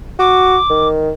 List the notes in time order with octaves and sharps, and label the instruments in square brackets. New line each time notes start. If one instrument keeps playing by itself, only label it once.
[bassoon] F#4 [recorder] D6
[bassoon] D#3